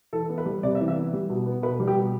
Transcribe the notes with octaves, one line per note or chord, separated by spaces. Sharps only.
E3 A4
B3
B4
G3
C3 D5
E5
E3
E5
B3
G3
B2
B3
B2 B4
G3
G4
B2